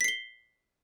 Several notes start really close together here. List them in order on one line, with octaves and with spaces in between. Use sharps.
B6 C7 G7